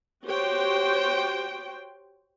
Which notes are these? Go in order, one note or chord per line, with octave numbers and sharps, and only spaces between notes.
F#4 G4 C5 C#5 G5